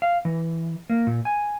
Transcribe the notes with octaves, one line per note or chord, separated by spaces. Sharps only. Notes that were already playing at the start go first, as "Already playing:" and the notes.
F5
E3
A#3
A#2
G#5